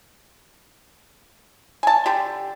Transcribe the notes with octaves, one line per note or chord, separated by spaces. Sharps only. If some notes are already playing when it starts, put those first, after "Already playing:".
G#5 A5
D3 G4